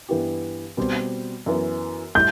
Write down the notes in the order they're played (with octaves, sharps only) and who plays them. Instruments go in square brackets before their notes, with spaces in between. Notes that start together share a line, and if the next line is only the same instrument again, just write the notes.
[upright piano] G2 E3 B3 E4 G4
B2 G3 C4
F#2 E3 B3
[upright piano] A2 G3 [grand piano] G6